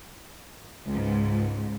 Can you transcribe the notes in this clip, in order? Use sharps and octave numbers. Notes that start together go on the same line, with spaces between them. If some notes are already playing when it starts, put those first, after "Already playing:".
C#2 G#2